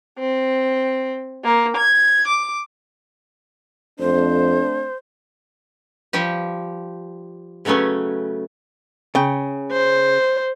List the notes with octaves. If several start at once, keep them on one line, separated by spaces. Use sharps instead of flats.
C4
A#3
G#6
D6
F2 A3 C4 D4 C5
F3 G3 G4
C#3 F#3 A3 B3 C#4
C#3 G5
C5